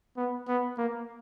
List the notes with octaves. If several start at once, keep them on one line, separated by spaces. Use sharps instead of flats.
B3
B3
A#3